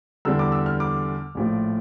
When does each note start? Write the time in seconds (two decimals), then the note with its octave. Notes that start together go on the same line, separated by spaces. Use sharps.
0.25 E2 D3 G3 D4 E6
0.39 D6
0.52 E6
0.66 F6
0.80 D6
1.35 A#1 A2 F3